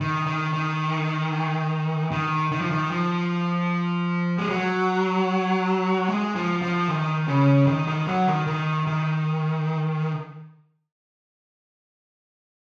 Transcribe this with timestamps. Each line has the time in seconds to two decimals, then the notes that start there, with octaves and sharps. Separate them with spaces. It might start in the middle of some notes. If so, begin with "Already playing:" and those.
0.01 D#3
0.26 D#3
0.53 D#3
2.12 D#3
2.52 D#3
2.61 F3
2.71 D#3
2.91 F3
4.38 G#3
4.50 F#3
6.09 G#3
6.35 F3
6.62 F3
6.88 D#3
7.28 C#3
7.67 D#3
7.87 D#3
8.07 F#3
8.27 D#3
8.47 D#3
8.87 D#3